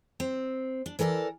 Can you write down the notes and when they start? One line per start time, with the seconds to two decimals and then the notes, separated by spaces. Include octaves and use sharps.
0.20 C4
0.86 D4
0.99 E3 A4 A#4 C#5 D5